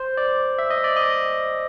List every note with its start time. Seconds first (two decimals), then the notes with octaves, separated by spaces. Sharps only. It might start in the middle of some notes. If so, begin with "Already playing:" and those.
Already playing: C5
0.17 D5
0.59 E5
0.70 D#5
0.84 D5
0.97 D#5